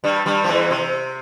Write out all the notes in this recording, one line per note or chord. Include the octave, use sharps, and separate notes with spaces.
G2 G3
G2 G3
F3
E2 E3
C3